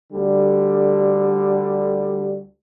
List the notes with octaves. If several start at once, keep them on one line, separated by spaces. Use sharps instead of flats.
D2 D3 G3